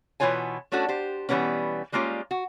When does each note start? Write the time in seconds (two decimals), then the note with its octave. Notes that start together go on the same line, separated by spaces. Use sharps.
0.20 B2 E3 B3 F4 C#5 G#5
0.72 A3 C#4 D4 F#4 A4
0.89 G4 C5
1.29 B2 E3 G3 A#3 B3 C#4
1.92 G3 G#3 A#3 C#4 F4 G4
2.31 F#4